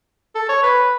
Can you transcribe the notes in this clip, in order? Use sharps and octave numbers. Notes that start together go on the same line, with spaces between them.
A4
C#5
B4